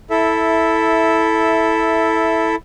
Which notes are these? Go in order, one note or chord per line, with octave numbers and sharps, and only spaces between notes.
E4 A4 E5